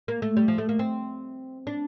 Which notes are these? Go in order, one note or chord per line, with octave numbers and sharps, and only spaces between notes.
A#3
A3
G3
F3
A3
A#3
C4
D4